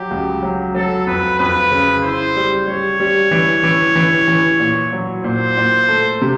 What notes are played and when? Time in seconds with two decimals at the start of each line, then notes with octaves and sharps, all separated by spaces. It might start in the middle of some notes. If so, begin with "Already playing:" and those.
Already playing: F#3 G4
0.11 C#2
0.43 F#3
0.75 F#3 A4
1.07 F2 B4
1.39 F2 B4
1.71 C#3
2.03 E4 C5
2.36 G3
2.67 G3 C#5
3.00 G3
3.31 E3
3.63 E3
3.96 E3
4.28 E3
4.60 A#2
4.93 F#3
5.24 A#2 C5
5.57 A#2
5.88 A3
6.22 C3